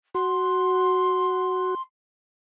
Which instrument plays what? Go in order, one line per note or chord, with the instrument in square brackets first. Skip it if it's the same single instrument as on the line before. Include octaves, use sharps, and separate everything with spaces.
[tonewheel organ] F#4 [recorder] C6